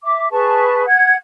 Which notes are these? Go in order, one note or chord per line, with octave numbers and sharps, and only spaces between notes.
E5 D6
G#4 B4 A5 C#6
F#5 G#6